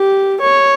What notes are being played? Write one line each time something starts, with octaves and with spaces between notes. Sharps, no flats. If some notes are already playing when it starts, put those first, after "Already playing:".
Already playing: G4
C#5